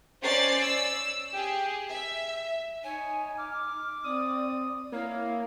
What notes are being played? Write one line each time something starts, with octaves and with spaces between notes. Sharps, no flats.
C#4 C5 D5 A6 C7
E6
G4 G#4
E5
D#4 C#5 G#5
D6 F6
C4 D5 D#6
A#3 E4 C#5 F5